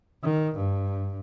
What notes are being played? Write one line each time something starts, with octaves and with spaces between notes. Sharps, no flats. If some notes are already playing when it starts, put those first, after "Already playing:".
D#3
G2